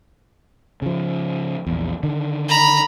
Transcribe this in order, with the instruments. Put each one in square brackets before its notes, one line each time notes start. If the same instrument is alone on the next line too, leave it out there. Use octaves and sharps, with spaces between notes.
[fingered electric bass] C#3 F3
A#1 E2
D3 D#3
[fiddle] A#5 B5